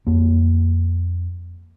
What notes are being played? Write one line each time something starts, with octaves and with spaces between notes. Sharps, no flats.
F2 A#3